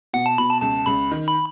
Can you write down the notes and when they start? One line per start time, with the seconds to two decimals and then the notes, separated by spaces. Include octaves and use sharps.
0.13 B2 F#5
0.26 A5
0.38 B2 B5
0.50 A5
0.62 C#2 A5
0.86 C#2 B5
1.11 D#3
1.28 B5